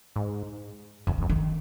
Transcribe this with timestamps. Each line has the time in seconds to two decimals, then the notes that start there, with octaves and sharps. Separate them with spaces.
0.16 G#2
1.07 F2 D#3
1.18 F2 F3
1.30 D#3